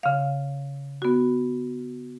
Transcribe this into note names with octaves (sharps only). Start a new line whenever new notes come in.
C#3 F5
B3 F#4